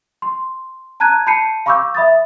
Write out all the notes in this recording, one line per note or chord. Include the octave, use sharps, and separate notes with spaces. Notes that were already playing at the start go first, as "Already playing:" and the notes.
C6
A5 A#5 F#6 G#6 D#7
A5 B5 G6 C7 C#7 D#7
F5 B5 C#6 D6 E6 G6
E5 B5 D#6 A6